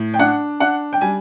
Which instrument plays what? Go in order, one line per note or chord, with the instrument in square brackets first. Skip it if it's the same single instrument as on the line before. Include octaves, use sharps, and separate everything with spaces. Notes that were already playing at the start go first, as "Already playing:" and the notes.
Already playing: [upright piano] A2
G5
D4 F#5
D4 F#5
G5
G3 G#5